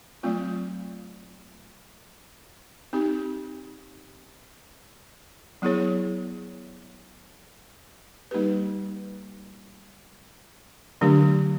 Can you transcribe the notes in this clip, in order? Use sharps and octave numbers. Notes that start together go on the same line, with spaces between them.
F#3 A3 C4 F4
C4 D#4 G4
F#3 B3 E4 G#4 C#5
G3 A#3 D#4 G4 B4
D3 F#3 A3 D4 G4